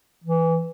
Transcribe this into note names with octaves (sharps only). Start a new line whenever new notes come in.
E3